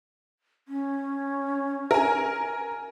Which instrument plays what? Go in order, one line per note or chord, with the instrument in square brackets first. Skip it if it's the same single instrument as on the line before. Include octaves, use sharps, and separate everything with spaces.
[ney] C#4
[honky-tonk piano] A#4 G#5